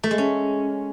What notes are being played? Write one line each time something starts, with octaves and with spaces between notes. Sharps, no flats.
A3
G#3
C#4